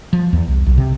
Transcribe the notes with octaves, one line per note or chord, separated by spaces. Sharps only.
F3
E2
C2
B1
C3